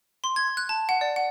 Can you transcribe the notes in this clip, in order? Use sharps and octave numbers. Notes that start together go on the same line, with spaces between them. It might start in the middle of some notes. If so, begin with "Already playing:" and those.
C6
G#6
F#6
A5
F#5
D5
F#5